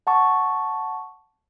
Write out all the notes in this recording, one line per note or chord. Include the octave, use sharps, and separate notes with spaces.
F#5 A5 C#6 D6